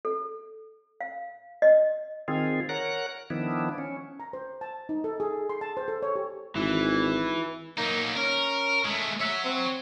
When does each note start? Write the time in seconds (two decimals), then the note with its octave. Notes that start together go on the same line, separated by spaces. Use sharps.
0.05 A4
1.01 F5
1.62 D#5
2.28 D#3 C4 F4 G#4
2.69 A#4 C#5 F#5 A#5 F#6
3.30 D#3 F3 B3 D4 E4
3.78 C#4
4.20 A#5
4.33 C5
4.61 A5
4.89 D#4
5.04 A4
5.20 G#4
5.49 C6
5.61 A5
5.77 C5
5.88 A4
6.03 C#5
6.16 G4
6.56 G#1 E3
7.77 F#3 A#3 D#4
8.16 C#4 A#4
8.85 G#3 A3
9.21 C#5 E5 F#5
9.45 C4